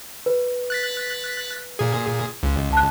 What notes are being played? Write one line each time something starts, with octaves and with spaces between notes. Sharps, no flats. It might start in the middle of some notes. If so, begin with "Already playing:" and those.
B4
F#6 A6 B6
A#2 G#4
C#2
A5 F#6